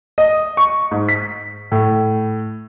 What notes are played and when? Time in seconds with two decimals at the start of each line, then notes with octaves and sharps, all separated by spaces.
0.18 D#5
0.57 C#6
0.91 G#2
1.09 B6
1.72 A2